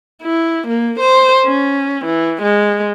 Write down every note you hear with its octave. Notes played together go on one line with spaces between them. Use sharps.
E4
A#3
C5
C#4
E3
G#3